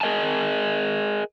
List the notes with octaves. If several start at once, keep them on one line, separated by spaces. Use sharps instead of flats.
G#4 A#4 D#5 G#5 A5